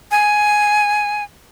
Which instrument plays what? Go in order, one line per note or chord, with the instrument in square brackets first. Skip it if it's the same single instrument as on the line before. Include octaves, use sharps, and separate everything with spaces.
[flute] G#5